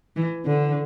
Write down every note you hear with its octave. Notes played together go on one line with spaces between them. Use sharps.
E3
D3